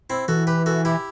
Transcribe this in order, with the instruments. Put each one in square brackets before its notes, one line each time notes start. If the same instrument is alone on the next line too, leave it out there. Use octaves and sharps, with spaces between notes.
[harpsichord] C4 E4
[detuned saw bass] E3 [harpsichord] F#4 A4
[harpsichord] G4 B4
F#4 A4
E4 G4